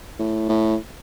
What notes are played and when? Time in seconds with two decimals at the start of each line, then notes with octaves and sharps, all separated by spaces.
0.18 A2
0.49 A2